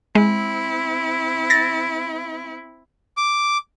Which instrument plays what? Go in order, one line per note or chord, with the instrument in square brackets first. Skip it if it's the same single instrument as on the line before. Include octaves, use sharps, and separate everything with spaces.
[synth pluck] G#3 [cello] C4 E4
[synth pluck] A6 A#6
[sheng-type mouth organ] D6